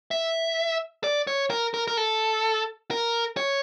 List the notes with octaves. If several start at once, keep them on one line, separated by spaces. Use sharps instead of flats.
E5
D5
C#5
A#4
A#4
A#4
A4
A#4
C#5